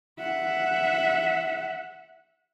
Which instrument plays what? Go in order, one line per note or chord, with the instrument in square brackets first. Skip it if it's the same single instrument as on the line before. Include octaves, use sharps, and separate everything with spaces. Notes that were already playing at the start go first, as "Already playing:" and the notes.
[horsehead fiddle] E5 F#5